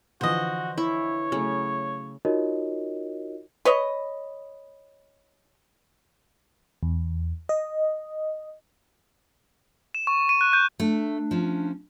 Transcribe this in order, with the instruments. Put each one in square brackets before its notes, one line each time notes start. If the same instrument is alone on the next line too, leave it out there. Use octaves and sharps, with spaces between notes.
[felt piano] D3 E3 F3 [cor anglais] F#4 [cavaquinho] C5 D#5
[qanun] E4 [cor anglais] C#5
[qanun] C#3 [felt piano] F#3 A3
[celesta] D#4 F4 F#4 A#4 C#5 D#5
[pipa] B4 C#5 D#5
[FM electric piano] E2
D#5
[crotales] E7
C#6
D#7
F#6
G6
[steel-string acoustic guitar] A3 [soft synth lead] D4
[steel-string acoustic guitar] F3 C#4